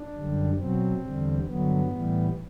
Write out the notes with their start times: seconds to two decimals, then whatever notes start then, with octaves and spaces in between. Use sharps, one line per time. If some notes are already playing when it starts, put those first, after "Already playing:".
Already playing: D4
0.15 F#2 D3 G3
0.58 B2 F#3 C4
1.02 E2 D3 G3
1.47 G2 D3 F#3 B3
1.92 A2 E3 G3